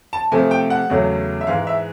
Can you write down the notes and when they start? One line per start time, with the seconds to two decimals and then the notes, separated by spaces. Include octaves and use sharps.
0.13 A5
0.32 C3 F3 A3 G#5
0.51 G5
0.70 F#5
0.90 E2 C#3 F#3 A3
1.41 E5
1.47 G#2 E3 G#3 F5
1.67 E5